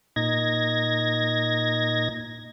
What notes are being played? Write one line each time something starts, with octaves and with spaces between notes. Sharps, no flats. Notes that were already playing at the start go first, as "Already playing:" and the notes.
A#2 D#4 G#6 A#6